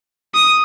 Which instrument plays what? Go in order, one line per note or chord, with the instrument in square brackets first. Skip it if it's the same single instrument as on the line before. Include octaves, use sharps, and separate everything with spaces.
[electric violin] D#6